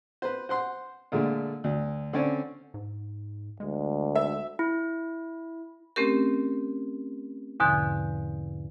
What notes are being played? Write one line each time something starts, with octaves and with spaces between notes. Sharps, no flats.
B4 C5
C5 F#5 C6
A#2 D3 G#3 A3
D2
D3 C4 C#4 D5
G#2
D2 G#3
E5
E4
A3 C4 C#4 G4 A#4
E2 G#2 B2 D3 F3